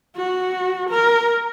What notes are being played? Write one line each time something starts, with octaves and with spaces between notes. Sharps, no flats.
F#4
A#4